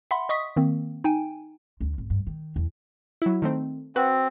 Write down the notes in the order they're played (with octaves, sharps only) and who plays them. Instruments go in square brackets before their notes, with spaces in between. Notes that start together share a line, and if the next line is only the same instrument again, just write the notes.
[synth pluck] E5 F#5 B5 C6
D#5 C#6 D#6 B6
D#3 A#3 C4
D#4 G5 G#5
[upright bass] D2
G#1
G2
D#3
E2
[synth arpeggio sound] F#3 E4
D#3 A3 C4
[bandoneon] C4 [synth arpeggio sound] F#4 B4 F#5